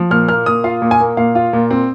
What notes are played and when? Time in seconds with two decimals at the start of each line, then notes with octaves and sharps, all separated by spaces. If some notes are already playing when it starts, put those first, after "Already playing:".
Already playing: F3
0.11 A#2 F6
0.28 A#3 F6
0.46 A#2 D#6
0.64 F4 F5
0.82 A#2
0.91 G#5
1.00 A#3
1.17 A#2 F5
1.35 F4
1.53 A#2
1.71 C4